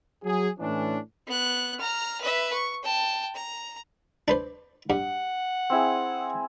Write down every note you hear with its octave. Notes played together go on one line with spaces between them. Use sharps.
F#3 G#4
A2 E3 C#4 D4
B3 F#6
A#5 F6
B4 E5
C#6
G5 A5
A#5
D4 B4 C5
G2 F#5
C4 E4 G#4